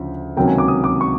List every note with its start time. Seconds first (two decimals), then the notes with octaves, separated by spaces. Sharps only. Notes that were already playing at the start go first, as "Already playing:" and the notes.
Already playing: D2 C#3 F3
0.37 C#2 C3 D#3 F#3 A#3 G5
0.48 G#5
0.58 D6
0.68 D#6
0.84 D6
1.01 C#6